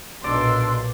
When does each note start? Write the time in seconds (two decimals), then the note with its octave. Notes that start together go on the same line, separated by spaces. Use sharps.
0.24 B1 A#2 D4 D#4 D5 C6 E6